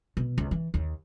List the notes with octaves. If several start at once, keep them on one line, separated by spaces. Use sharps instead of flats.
B2
C#2
E3
D#2